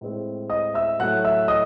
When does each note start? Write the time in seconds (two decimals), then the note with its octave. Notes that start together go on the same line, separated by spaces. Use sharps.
0.01 A2 G#3 C4
0.50 D#5 D#6
0.74 E5 E6
0.99 A2 F#3 A3 F#5 F#6
1.24 E5 E6
1.48 D#5 D#6